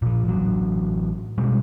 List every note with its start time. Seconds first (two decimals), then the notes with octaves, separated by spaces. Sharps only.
0.02 A#2 F3
0.25 A1 F#3
1.38 B2 G3 G#3